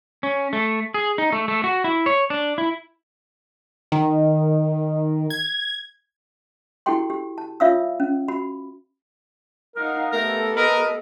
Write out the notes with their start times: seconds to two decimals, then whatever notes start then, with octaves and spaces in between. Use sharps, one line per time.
0.23 C#4
0.53 A3
0.94 G#4
1.18 D#4
1.32 A3
1.48 A3
1.64 F#4
1.84 E4
2.06 C#5
2.30 D4
2.58 E4
3.92 D#3
5.30 G#6
6.86 E4 F#4 G4 A4 G5 C6
7.10 G4
7.38 A5
7.60 F4 C#5 E5 F5 D#6 E6
8.00 C#4
8.28 F#4 B5
9.76 D#4 A#4 F5 F#5
10.13 A3 B3 G4 A4 A#4
10.57 A#4 B4 D#5